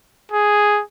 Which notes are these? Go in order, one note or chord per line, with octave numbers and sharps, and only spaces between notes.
G#4